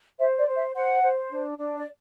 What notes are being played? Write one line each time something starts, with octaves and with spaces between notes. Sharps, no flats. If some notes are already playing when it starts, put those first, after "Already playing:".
C5 E5
D5
C5
E5
C5 F#5
C5
D4
D4
D5